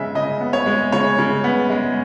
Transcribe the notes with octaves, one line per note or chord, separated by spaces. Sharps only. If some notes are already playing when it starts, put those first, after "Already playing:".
Already playing: C#3 G#3 B3 E5
C#3 D#5
B3
C#5
G#3
C#3 C#5
C#3
B3
G#3